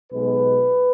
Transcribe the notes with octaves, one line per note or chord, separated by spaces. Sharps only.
B1 B2 G#3 B4